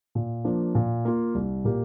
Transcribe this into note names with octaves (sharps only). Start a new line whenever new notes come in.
A#2
F3 A#3 D4
A#2
A#3 F4
C2
A#2 A#3 G4